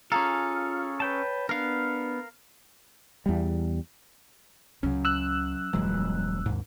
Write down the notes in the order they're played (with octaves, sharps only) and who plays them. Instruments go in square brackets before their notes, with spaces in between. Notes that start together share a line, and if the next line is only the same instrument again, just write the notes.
[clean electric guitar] C#4 G#4 A4 [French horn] F4 [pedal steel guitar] F5 [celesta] A#5
[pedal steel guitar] B4 G5 A5 [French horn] C#5
[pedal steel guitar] B3 [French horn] D4 [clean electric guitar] A#4 F5 [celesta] F6
[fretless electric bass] E2 G3
[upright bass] C#2 C#3 [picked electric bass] F#3 C#4
[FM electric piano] E6 F#6
[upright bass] D#1 F#2 [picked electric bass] E3 F#3 G#3
[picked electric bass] D#2 G#2 [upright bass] D3 D#3